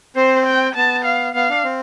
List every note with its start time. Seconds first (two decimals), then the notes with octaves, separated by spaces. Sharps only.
0.16 C4 C5
0.46 G5
0.75 B3 A5
1.05 F5
1.35 B3 F5
1.49 D4
1.64 C4